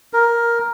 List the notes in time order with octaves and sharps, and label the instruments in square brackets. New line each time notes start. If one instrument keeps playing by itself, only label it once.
[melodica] A#4